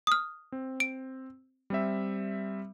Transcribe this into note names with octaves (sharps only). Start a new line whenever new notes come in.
D#6 F6
C4
D7
G3 C4 E5